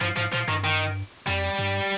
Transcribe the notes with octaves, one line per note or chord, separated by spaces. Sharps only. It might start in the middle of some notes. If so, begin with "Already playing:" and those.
G2 F3
G#2 F3
A#2 F3
G2 D#3
D#3
F2 G3
G2